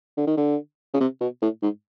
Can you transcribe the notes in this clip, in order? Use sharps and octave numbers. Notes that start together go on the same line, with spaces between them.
D3
D#3
D3
C#3
C3
B2
A2
G#2